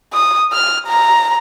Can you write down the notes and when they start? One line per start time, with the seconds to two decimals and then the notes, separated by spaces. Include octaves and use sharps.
0.13 D#6
0.52 F6
0.87 A#5